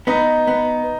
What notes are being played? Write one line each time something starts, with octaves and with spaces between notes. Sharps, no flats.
B3 D#4
B3